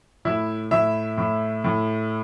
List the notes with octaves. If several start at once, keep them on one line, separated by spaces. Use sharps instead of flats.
A2 E4 E5
A2 E4 E5
A2
A2